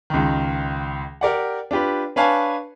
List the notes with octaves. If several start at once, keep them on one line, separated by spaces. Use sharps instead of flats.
C#2 D#3
G4 A#4 D5 F#5
D4 F4 G4 B4
D4 B4 C#5 F5 G#5 A5